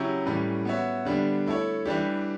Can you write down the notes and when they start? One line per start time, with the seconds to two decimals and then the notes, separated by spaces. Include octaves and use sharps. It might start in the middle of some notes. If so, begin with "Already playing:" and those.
Already playing: C#3 F#3 C#4 E4 G4
0.26 A2 E3 G3 C#4
0.65 B3 F#4 C#5 E5
1.05 D3 G3 B3 D4
1.46 A3 E4 A4 C#5
1.85 E3 G3 D4 G4